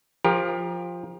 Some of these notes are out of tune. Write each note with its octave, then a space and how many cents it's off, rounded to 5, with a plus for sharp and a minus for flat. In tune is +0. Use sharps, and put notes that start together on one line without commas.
F3 +5 G4 +35 A#4 +20